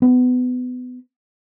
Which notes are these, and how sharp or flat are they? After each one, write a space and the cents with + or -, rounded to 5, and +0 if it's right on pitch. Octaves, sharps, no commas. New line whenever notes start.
B3 +25